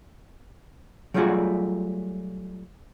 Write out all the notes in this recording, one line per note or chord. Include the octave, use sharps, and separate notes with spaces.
F#3 G3 A3 F4 F#4 G#4